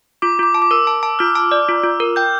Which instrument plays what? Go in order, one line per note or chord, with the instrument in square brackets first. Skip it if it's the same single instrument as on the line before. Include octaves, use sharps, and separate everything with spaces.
[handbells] F4 [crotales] D6
[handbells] F4 [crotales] D6
[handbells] A5
[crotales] D6
[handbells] A#4 [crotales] E6
[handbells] A5
A5
[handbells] F4 [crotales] F6
[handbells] A5
D5
F4
F4
A#4
[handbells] G5 [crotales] G6